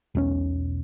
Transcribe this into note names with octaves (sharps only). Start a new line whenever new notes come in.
E1 B1 C4 C#4